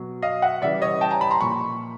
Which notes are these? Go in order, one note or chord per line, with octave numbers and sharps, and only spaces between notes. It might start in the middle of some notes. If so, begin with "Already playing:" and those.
Already playing: B2 F#3
D#5 F5
E5 F#5
C#3 E3 G3 D5 E5
C#5 D#5
G5 A5
G#5 A#5
A5 B5
A#5 C6
A#2 F3 B5 C#6